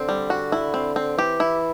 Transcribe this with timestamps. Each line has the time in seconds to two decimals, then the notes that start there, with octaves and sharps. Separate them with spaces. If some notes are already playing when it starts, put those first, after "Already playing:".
Already playing: D3 C4
0.09 G3
0.30 F#4
0.52 E4
0.74 C4
0.96 C4
1.18 E3 G4
1.40 E4